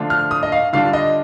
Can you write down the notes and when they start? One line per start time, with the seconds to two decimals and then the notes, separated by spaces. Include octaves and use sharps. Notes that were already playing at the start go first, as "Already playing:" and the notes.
Already playing: D3 F3 A3 D4 F4
0.10 F6
0.31 D#6
0.43 D#5
0.52 F5
0.73 D3 G3 D4 F4 F5
0.93 D#5